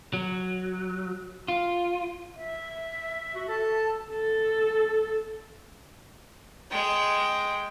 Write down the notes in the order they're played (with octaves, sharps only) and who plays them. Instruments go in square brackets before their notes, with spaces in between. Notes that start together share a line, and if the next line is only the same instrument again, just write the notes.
[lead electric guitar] F#3
F4
[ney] E5
[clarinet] F#4
[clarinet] A4 [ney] A5
[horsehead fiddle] A4
[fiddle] G#3 G5